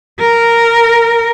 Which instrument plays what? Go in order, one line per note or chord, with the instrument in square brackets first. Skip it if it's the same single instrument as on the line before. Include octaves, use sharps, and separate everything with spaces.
[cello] A#4